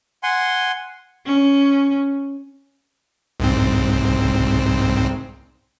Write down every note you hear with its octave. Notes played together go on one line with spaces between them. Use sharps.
F#5 G#5 C6
C#4
C2 G#2 C4